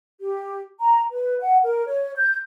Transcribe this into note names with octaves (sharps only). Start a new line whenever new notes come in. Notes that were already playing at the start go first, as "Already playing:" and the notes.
G4
A#5
B4
F#5
A#4
C#5
G6